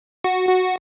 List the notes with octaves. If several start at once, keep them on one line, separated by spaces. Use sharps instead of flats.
F#4
F#4